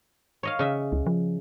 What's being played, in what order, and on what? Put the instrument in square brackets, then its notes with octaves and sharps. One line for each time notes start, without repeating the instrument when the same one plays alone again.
[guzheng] C#5 D#5 F5
C#3 D#5 E5
[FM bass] C#2
F3